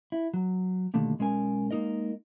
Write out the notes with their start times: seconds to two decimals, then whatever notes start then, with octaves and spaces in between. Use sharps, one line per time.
0.12 E4
0.34 F#3
0.94 B2 D3 D#3 G3 A3 A#3
1.19 B1 G#3 C#4 A#4 G#5
1.71 G#3 A#3 D#4 A#4 D#5